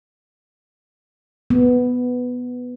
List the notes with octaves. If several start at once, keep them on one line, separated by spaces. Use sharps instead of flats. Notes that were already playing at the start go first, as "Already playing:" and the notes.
B3